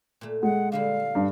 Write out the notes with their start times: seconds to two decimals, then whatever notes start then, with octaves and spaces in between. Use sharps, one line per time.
0.21 A#2 A3
0.43 G#3 F#5
0.72 D3 G3 E4 F5
1.15 G2